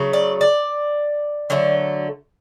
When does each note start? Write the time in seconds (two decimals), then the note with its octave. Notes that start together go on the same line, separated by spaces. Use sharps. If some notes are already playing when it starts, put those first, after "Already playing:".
Already playing: C#3 F#3 A3
0.13 D5
0.41 D5
1.50 D3 F#3 A3